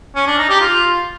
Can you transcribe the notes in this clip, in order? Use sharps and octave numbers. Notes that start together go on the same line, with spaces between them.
C#4
D4
D#4
G4
F4